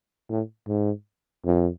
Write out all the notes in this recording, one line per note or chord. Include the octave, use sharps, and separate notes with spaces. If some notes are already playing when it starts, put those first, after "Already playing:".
A2
G#2
F2